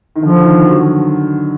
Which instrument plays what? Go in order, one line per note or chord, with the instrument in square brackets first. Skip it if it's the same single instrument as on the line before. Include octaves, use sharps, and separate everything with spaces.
[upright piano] D#3
[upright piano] D3 [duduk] F3
[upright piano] D#3
F#3